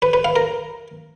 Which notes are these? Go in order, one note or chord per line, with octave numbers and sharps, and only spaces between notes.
B4
B4
F5
A#4